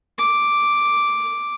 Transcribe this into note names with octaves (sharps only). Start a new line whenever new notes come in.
D6